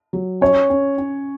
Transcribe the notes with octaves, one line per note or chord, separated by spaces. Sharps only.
F#3
C#4 C#5
C#4
C#4